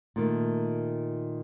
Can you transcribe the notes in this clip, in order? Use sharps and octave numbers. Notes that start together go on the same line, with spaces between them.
A#2 D#3 A3